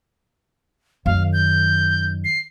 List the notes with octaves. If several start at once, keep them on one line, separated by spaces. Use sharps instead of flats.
F#2 D#3 F5
G6
C7